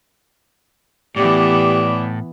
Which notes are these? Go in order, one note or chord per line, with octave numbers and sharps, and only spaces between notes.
A2 E3 B3 G4 D5